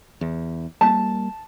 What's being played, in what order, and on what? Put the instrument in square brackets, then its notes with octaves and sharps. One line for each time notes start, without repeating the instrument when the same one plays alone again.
[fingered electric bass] E2
[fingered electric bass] G3 A#3 [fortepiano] A5